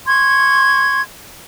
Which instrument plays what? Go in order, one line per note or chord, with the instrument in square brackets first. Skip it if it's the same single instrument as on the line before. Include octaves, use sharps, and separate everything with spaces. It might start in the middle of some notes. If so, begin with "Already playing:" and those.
[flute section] C6 C#6 G#6